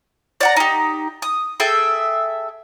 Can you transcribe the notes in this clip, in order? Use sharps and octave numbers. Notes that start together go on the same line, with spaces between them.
D5 F#5 A#5
D#4 G4
D#6
G#4 A4 E5 G5